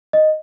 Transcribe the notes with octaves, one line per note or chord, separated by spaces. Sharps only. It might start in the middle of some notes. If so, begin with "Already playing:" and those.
D#5